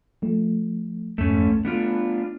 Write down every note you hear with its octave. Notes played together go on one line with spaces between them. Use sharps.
F3 A3
C2 F2 G#2 A3 C#4
A3 B3 D4 F4